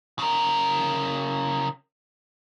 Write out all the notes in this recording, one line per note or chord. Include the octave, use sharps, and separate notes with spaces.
C#3 A#4